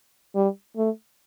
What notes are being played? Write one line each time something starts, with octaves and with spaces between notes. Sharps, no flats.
G3
A3